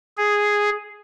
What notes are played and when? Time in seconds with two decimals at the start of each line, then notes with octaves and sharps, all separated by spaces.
0.17 G#4